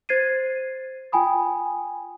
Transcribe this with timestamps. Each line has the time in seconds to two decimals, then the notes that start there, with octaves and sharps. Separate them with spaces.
0.09 C5 G#6 A6 C7 D#7
1.12 F4 G5 G#5 B5 D#6